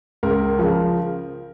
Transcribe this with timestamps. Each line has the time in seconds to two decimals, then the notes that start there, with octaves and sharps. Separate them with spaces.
0.23 C#2 A#4
0.59 C#3 F3